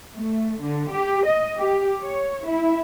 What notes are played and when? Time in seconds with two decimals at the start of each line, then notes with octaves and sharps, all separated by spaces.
0.15 A3
0.62 D3
0.91 G4
1.26 D#5
1.59 G4
2.02 C#5
2.47 E4